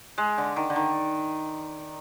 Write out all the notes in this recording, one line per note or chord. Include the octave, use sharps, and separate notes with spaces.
G#3
D3
D#3
D3
D#3